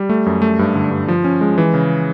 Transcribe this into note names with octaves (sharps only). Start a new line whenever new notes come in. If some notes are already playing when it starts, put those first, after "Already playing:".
Already playing: G3
A3
F#2
A3
G2
D3
G2
F3
C#4
G#3
E3
C#3